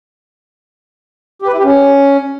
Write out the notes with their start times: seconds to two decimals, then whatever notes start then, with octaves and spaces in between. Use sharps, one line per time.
1.42 G4
1.48 B4
1.53 E4
1.58 G4
1.64 C#4